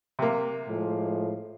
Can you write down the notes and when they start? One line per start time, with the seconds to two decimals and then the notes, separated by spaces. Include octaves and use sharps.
0.19 C3 A#3
0.66 A2 F3 G#3